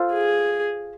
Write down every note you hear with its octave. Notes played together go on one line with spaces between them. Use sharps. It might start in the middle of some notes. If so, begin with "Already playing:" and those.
Already playing: F4 A4 C5
G#4